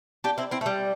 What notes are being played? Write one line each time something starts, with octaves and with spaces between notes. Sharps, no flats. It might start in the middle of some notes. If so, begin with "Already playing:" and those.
D4 G4
C4 E4
C4 E4
A3
G3